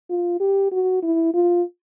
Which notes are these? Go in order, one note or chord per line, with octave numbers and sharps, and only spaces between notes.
F4
G4
F#4
E4
F4